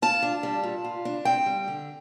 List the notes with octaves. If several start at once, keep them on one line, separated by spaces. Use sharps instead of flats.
F4 A5
D4
G3
A#2
F4
D4
C4 G5
G3
D3